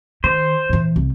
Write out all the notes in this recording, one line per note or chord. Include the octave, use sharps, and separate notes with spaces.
D#3 C5
A#2 E3
C2